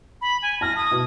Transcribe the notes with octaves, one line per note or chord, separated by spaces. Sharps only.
B5
G#5
A5 F6 A#6
D#6
B2